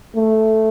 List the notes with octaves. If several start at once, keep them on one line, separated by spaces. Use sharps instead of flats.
A3